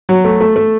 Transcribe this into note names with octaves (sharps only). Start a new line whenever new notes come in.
F#3
A3
A3
A3